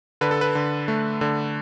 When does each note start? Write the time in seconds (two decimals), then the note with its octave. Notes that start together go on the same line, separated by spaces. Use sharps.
0.21 D3 B4
0.31 A4
0.41 B4
0.55 D3
0.88 A3
1.21 D3